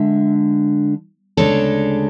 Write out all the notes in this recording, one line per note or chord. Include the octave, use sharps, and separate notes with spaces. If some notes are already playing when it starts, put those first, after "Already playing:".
Already playing: D3 G#3 D4 E5
D2 C#3 G#3 D4 A4 C#5